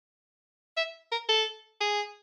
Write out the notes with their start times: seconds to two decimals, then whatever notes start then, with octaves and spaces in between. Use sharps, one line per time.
0.77 E5
1.12 A#4
1.29 A4
1.81 G#4